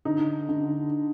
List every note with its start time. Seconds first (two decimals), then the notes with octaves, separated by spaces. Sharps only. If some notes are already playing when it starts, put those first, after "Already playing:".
0.05 D3 D#4
0.49 D3